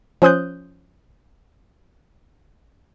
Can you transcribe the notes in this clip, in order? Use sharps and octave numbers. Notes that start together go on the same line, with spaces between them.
F3 C#4 C5 D#6 F#6 G6